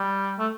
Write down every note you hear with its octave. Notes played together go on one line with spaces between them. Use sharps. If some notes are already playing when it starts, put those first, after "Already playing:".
Already playing: G3
A3